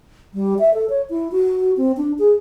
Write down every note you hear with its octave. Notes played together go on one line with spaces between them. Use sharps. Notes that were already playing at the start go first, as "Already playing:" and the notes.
G3
E5
A4
C#5
E4
F#4
C4
D4
G#4